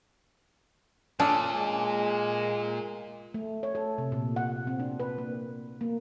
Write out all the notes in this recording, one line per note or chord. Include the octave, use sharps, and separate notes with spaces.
A#2 C#4 D4 G#4 A4
G#3
A3
C#5
A4
C3
A#2
F#5
C4
D4
B4
A#3
A#3